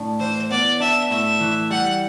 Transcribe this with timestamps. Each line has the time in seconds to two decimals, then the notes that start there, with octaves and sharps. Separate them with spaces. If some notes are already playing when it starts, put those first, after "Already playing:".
Already playing: A2 D4
0.19 E3 C5
0.51 B3 D5
0.80 D4 E5
1.11 A2 E5
1.40 E3
1.70 G3 F#5